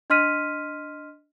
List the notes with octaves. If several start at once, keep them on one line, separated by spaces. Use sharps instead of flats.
D4 D#5 C6 F6 B6 D#7